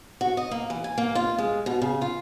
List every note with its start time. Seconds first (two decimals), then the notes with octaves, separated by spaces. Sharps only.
0.21 F#4
0.37 D#5
0.51 A#3
0.70 E3
0.84 G#5
0.98 A#3
1.15 F4
1.38 G#3
1.66 B2
1.82 C#3
2.01 F4